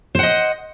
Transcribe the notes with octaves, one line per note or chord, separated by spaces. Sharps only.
C5 D#5 F#5